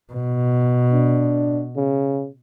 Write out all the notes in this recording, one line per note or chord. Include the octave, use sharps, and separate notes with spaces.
B2
D4
C#3